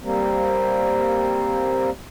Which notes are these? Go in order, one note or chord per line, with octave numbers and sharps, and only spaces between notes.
G3 A#3 C4